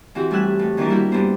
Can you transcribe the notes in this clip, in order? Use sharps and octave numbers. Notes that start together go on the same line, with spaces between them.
E3 C4 F#4 G4
A2 G3 G#5 E6 F#6
A2
D#3 E3 A#3 D4 F#4 A#4
G3 E4 F#4 G4
G2 A#3 B3 C5